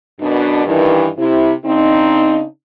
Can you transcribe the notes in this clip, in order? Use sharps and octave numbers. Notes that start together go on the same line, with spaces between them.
F#2 B2 D4
G2 D#3 E3
C3 E4
C#3 C4 D4 D#4